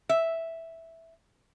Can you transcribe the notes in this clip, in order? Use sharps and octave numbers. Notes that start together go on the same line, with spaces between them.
E5